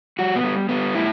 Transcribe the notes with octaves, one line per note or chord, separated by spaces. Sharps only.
G3 F#4
B3
G3
G3 B3
A2 E4